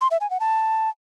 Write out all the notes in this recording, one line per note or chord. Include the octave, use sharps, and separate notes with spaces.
C6
E5
G#5
F#5
A5